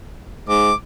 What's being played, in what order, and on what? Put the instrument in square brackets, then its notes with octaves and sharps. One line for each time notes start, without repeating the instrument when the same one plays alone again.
[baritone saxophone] G#2 [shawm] D6